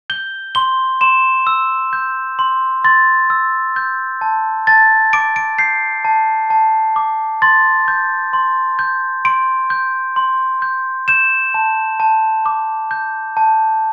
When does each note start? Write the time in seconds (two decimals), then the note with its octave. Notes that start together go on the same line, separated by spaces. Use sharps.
0.10 G6 G7
0.55 C6 G7
1.01 C6 E7
1.47 E6
1.93 G6
2.39 C6
2.84 C6 A6
3.30 E6
3.76 G6
4.21 A5
4.67 A5 A6
5.13 D6 D7
5.36 D7
5.58 G6 C7
6.05 A5
6.50 A5
6.96 D6
7.42 C6 A6
7.88 G6
8.33 C6
8.79 G6
9.25 C6 D7
9.70 G6
10.16 C6
10.62 G6
11.08 G6 E7
11.54 A5
12.00 A5
12.46 D6
12.91 G6
13.37 A5